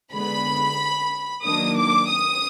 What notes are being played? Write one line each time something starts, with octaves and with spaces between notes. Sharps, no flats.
D3 G#3 B3 B5
D#3 F#3 A#3 D4 D#6
D6
D#6